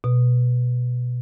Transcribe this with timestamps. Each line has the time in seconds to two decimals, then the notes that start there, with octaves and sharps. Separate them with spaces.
0.04 B2